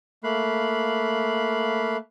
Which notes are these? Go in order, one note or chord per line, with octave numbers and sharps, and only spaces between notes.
A3 A#3 F5 B5 F#6